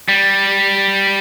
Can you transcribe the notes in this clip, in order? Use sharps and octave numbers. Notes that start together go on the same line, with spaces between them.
G3